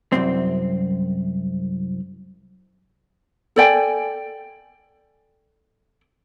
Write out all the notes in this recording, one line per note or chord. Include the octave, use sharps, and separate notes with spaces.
C2 F#2 C4
A4 D5 G5 G#5